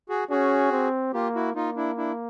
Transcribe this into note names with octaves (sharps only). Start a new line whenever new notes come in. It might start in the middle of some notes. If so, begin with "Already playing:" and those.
F#4 G#4
C#4 F#4 G#4
C4
A#3 F4 G4
E4 F#4
A#3 D#4 F4
D4 E4
D4 E4